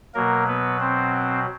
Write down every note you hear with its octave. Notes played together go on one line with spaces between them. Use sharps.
B2 F#3 A#3 A#4
B3 B4
C4 C5